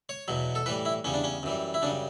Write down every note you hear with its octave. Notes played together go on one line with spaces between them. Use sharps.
C#5
E2 B2 F#3
A4
A2 E3 G3 B4
E4
E2 C#3 G3 C#4
D4
C#4
F#2 E3 G3
E4
F#2 C#3 G3 D4